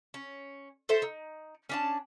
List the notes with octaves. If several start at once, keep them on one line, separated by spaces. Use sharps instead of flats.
C#4
A4 C5 E5
D#4
C#4 D4 A5